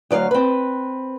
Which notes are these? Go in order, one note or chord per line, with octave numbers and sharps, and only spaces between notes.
D2 F#3 D5 F5
C4 B4